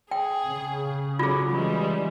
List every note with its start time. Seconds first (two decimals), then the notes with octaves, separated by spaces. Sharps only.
0.11 G#4 G5
0.47 C#3
1.19 F#3 C#4 F4 G#4
1.49 E3 G3 G#3